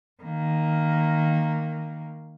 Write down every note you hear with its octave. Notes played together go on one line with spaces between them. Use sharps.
D#3 A#3